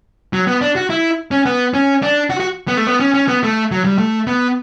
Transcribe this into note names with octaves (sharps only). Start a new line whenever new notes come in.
F#3
B3
D4
F#4
E4
C#4
B3
C#4
D4
F#4
F#4
B3
A3
B3
C#4
C#4
B3
A3
F#3
G3
A3
B3